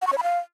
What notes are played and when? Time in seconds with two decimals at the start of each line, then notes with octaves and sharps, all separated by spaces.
0.02 F#5
0.07 C#6
0.12 C#5
0.18 B5
0.23 F5